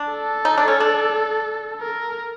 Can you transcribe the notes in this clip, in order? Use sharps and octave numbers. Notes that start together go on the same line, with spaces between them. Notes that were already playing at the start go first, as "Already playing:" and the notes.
Already playing: D4
A4
D#4
D4
C#4
D4
A#4